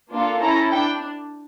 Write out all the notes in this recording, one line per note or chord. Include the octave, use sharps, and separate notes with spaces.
A#3 D4 F4 A4
C#4 E4 A4 A#5
D4 G5